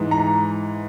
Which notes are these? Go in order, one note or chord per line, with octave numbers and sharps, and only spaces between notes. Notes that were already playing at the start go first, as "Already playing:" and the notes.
Already playing: G#2 E3
A#5